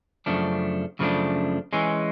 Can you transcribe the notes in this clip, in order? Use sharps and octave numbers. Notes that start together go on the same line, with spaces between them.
F#2 C#3 F3 A3 D4
F#2 C#3 F3 A3 D4
E3 G#3 C#4